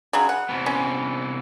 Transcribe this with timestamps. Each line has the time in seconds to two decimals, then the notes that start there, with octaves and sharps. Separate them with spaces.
0.13 C#3 F#3 G#3
0.29 F#5
0.49 C3 E3 B3
0.66 C#4